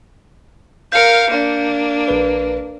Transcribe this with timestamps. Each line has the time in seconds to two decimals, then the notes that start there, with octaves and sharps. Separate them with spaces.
0.92 A#4 F5 G6 C#7
1.31 A#3 D4
2.08 A#1 B4